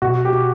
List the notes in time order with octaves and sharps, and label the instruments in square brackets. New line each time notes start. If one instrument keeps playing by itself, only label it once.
[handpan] B2 [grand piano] F#4
[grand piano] G4
[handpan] F#4